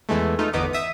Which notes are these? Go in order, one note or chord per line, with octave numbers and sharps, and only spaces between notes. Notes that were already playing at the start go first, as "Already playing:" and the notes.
E2 E3 G#3 A3
A3 D#4 F4
G1 E2 B3 D#4 D6
E5 D#6